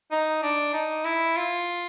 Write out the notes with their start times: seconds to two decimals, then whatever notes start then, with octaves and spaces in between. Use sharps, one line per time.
0.12 D#4
0.43 D4
0.74 D#4
1.05 E4
1.36 F4